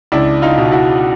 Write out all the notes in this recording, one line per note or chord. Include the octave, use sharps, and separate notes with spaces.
C#2 D4 E4
D#4 F4
B2
E4 F#4